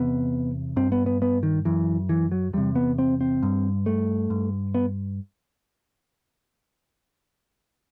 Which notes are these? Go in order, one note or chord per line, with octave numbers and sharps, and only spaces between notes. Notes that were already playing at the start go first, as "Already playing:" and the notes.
Already playing: E2 C3 B3
G2 C4
B3
B3
B3
D#3
F#2 E3
E3
F#3
E2 C3 G3
B3
C4
C4
G2
A3
G2
B3